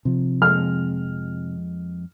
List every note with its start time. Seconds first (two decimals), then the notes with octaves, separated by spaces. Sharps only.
0.05 C3 F3
0.42 F2 G#3 F6